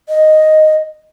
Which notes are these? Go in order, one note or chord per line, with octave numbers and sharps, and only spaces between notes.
D#5